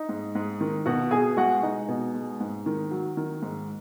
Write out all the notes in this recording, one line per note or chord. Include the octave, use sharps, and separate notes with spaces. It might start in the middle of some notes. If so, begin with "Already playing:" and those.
Already playing: D#4 D#5
G#2
G#2
D#3
B2 F#4 F#5
B2 G#4 G#5
G#3 F#4 F#5
G#3 D#4 D#5
B2
G#3
G#2
D#3
F#3
D#3
G#2